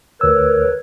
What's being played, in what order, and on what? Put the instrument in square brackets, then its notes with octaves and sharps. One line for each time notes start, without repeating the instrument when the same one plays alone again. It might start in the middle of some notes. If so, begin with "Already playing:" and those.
[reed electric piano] D2 E6 [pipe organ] A#4 B4 C#5